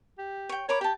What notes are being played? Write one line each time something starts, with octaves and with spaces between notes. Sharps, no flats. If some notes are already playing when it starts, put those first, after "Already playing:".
G4
C#5 G5
A#4 C#5 B5 D6
G4 G5 A5